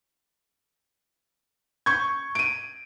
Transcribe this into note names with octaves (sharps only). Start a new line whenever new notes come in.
C#6 G6 G#6
D7 D#7